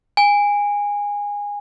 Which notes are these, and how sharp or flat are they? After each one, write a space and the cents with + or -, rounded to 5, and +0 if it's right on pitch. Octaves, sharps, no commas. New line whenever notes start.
G#5 -20